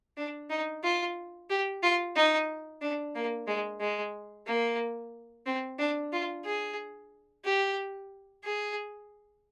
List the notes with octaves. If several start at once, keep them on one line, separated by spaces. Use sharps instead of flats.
D4
D#4
F4
G4
F4
D#4
D4
A#3
G#3
G#3
A#3
C4
D4
F4
G#4
G4
G#4